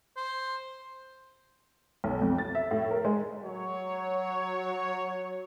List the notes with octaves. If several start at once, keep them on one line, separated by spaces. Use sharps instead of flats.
C5
B1
F2
A6
E5
A2
A#4
G#3
F#3 C#5